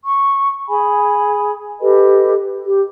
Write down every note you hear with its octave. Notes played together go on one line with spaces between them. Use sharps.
C#6
G#4 G#5 B5
G4 A4 B4 D#5
G4